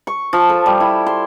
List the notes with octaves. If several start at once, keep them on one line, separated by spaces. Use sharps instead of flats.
C#6
F3
A4
G3
E4
C6